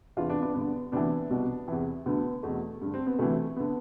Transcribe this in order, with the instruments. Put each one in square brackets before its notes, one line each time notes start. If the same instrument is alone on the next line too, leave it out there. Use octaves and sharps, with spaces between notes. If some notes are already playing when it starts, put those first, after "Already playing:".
[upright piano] E2 C3 E3 D4 F4
B3 D4
B3 D4
G2 D3 B3
D2 C3 E3 B3 D4
C2 B2
E2 C3 E3
D2 D3 B3
E2 B2 A3
G2 D3
C4
B3
D2 C3 E3 A3
D3 B3